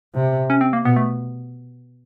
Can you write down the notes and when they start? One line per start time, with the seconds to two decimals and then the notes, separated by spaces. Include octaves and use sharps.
0.15 C3
0.50 C#4
0.61 C4
0.73 A#3
0.85 B2 B3
0.96 A3